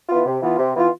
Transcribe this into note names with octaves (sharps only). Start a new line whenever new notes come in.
E3 B3 F4
C3
E3 B3 F4
C3
E3 B3 F4